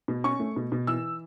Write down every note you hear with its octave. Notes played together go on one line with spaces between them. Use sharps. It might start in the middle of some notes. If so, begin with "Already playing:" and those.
B2
C#4 C#6
A3
B2
B2
E3 E6